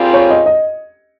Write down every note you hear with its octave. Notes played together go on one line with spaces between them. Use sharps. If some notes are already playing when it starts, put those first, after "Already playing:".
Already playing: A#2 G3 C4 F4 G#4
C#5
D#5
D#5